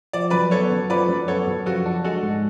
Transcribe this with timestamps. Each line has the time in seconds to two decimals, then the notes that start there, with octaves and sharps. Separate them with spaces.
0.13 F3 D5
0.30 F#2 B4 D5
0.51 B3 A4 C#5
0.71 F#2
0.90 F3 B4 D5
1.09 F#2
1.28 B3 A4 C#5
1.47 F#2
1.66 F3 F#4 A4
1.86 D4
2.04 G#3 F#4 A4
2.23 G#2